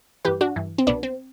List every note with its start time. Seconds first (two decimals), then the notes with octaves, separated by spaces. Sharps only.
0.25 G2 E3 G4 B4
0.41 D4 F#4
0.56 G2 E3
0.78 C4
0.87 C2 B2 B3 D4
1.03 C4